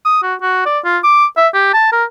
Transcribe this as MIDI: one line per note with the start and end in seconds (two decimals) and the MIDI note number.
0.05 0.21 87
0.23 0.35 66
0.42 0.64 66
0.66 0.79 74
0.85 0.98 65
1.04 1.26 86
1.37 1.48 76
1.54 1.73 67
1.74 1.92 81
1.92 2.04 70